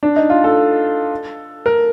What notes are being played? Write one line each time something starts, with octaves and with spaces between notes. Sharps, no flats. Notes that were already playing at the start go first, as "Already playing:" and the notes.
D4
D#4
F4
A4
A#4